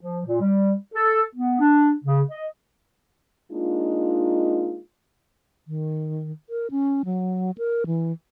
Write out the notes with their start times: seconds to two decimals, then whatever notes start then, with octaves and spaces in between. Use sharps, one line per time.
0.01 F3
0.26 A#2
0.41 G3
0.94 A4
1.36 B3
1.60 D4
2.05 C#3
2.31 D#5
3.51 G#3 A#3 D4 D#4 F4
5.67 D#3
6.50 A#4
6.71 C#4
7.05 F#3
7.58 A#4
7.87 E3